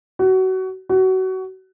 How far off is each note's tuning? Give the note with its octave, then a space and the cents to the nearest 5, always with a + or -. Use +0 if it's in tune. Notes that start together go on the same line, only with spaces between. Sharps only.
F#4 +25
F#4 +25